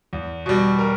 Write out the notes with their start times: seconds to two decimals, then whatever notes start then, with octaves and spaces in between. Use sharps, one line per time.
0.13 E2
0.46 B2 G3
0.79 A#4